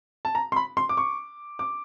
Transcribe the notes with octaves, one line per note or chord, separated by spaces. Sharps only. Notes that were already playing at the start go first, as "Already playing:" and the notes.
A5
A#5
C6
B5
C6
D6
C#6
D6